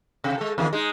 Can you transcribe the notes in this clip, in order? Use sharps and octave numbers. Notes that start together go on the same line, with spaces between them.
C3
G#3 A4
E2 D#3 G#4
G#3 D#4